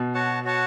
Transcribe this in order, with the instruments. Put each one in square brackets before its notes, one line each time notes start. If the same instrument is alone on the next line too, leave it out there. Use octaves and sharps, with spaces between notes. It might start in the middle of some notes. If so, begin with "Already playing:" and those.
Already playing: [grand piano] B2
[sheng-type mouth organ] F#4 C#5 F#5 A5
F#4 C#5 F#5 A5